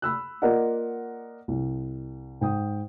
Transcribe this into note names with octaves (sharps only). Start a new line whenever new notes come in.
B5 E6 F#6
A#3 F4 A#4 D5 D#5 F#5
C2
G#2 G5 D#6